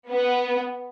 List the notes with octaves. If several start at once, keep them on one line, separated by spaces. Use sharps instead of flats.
B3